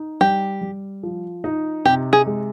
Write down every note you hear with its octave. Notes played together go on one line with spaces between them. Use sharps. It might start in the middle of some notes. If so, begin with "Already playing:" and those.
Already playing: D#4
G3 G4
G3
F3
D#4
C3 G4
G#4
G#3